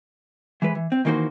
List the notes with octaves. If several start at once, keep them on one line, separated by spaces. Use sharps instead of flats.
E3 G#3 B4
E3
C4
D#3 E3 A#3 D#4 F#4 C5